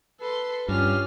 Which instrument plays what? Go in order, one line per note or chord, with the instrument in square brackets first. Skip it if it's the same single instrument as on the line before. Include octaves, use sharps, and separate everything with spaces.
[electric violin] A4 C6 [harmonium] B4
[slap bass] G2 [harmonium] C#4 G4 [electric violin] F4 F6